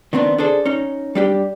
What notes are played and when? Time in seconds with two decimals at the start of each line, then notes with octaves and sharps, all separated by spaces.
0.13 D#3 B3 C4 D4
0.38 D4 G#4 A4 C5
0.66 C#4 D#4
1.15 G3 D4 G4